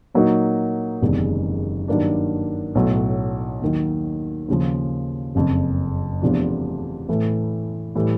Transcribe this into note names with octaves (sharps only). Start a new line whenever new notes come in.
A#2 F#3 A#3 D#4 F#4
F#1 E2 C3 D#3 G#3
G2 D#3 F#3 A#3 D4
B1 A2 F#3
D#2 D#3 F#3
D#2 C#3 F3
F#1 F2 C#3
E2 C3 F3 A3 D4
A2 E3 A3
A2 E3 G3